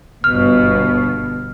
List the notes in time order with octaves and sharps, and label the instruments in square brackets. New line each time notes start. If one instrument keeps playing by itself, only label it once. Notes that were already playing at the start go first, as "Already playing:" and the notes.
[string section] G1 B2 [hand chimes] F6